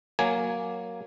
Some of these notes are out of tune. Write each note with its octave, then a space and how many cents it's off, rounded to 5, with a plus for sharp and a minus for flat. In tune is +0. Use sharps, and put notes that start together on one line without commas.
F#3 +0 A#3 +0 G#5 +0